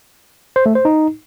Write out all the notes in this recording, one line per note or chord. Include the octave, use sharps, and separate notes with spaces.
C5
A3
C5
D#4